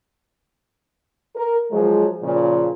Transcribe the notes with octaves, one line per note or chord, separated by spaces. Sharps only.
A#4
F3 F#3 G#3
A#2 C#3 F3